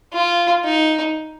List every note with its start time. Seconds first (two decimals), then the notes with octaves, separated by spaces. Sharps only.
0.13 F4
0.64 D#4